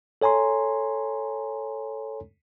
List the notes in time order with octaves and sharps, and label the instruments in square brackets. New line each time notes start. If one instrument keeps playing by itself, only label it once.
[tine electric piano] A4 C#5 G#5 A#5 C6